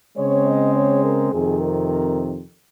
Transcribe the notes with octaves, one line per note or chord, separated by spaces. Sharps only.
C#3 G#3 C4 C#5
D#5
C#5
A#4
F2 C3 D#3 G#4
A#4
A#4